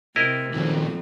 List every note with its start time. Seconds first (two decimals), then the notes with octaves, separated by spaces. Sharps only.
0.16 C3 E4 A#4 D#5
0.54 F2 A#2 D#3 F#3 G3